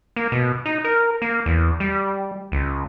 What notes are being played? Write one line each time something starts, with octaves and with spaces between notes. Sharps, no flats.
A#3
B2
D#4
A#4
A#3
E2
G3
C#2